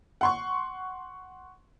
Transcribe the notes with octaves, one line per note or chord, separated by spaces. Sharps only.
F#5 C6 C#6